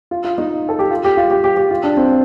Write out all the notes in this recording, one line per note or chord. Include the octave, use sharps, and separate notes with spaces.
F4
F4
D#4
A4
G4
F4
G4
F4
G4
G4
G4
F4
D4
C4